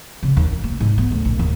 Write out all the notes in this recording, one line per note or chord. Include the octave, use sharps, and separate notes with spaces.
C#3
D#2
F#2
A#3
G#2
B3
D2
A#1
D#2